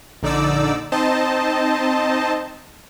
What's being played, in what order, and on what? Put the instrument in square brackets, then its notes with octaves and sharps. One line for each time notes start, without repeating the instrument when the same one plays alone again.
[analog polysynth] A#1 D3 D#4 D5 D6 E6
C4 D#4 C5 D#5 A5